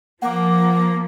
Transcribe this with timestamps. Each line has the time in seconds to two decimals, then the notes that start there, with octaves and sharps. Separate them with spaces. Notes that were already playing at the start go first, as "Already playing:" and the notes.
0.22 F3 A#3 F#5 D6